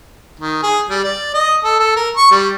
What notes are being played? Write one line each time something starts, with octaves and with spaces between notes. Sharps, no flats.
D#3
G#4
G3
D5
D#5
A4
A4
A#4
C#6
G3